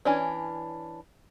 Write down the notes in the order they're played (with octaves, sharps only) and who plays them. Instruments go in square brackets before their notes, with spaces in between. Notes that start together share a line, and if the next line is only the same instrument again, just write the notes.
[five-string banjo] E3 C#4 D4